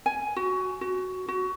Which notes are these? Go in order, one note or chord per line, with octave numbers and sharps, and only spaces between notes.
G#5
F#4
F#4
F#4